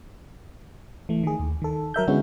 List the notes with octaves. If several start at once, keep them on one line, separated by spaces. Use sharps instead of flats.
E3 A3
D#3 G#4
D#2
D#3 A4
F#3 A#4 E5 G6
D3 G#3 B3 C#4 E4 F#4